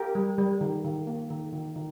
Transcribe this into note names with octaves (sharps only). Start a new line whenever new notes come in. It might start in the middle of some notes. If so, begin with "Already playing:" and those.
Already playing: G4 A#4
G3
G3
D#3
D#3
A#3
D#3
D#3
D#3